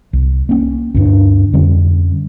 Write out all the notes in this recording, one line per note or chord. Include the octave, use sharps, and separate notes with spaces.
C2
A#3 C#4
D2 G2 D4
F2 D3 G3 C#4